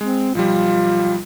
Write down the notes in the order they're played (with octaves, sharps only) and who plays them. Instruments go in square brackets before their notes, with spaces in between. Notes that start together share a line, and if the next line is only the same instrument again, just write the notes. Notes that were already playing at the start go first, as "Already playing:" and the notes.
[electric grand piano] G#3 [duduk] C4
[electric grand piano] B1 F3 G3 [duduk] F4